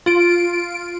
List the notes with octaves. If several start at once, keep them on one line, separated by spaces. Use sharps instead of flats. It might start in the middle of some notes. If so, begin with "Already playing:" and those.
F4 D7